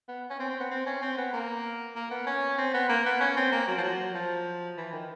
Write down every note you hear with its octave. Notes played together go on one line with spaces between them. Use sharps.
B3
C#4
C4
C4
B3
C4
C#4
C4
B3
A#3
A#3
B3
C#4
C4
B3
A#3
B3
C#4
C4
A#3
F#3
F3
F#3
F3
E3
D#3